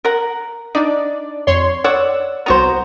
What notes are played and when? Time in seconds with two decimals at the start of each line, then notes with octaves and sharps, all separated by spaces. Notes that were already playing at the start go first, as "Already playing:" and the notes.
0.05 A#4 F#5
0.75 D4 D#4 D5
1.47 F2 C#5 C6
1.84 C#5 D5 F#5 E6
2.46 C2 B3 F#4 C5 A#5